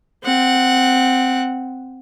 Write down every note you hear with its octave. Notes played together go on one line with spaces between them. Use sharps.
C4 F#5